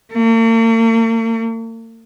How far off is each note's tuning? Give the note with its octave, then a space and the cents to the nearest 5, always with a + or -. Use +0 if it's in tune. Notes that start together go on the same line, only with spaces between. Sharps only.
A#3 -45